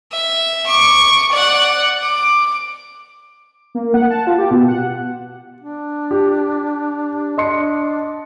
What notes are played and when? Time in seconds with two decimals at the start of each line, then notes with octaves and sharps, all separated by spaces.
0.12 E5
0.66 C#6 D6
1.31 D5 F#5
2.01 D6
3.75 A#3
3.94 F#5
4.10 A5
4.27 F4
4.38 G4
4.51 B2
4.68 F#5
5.61 D4
6.11 G4
7.38 D4 D#5 C6 C#7